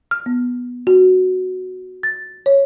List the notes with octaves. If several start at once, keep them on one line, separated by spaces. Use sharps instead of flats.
F6
B3
F#4
A6
C#5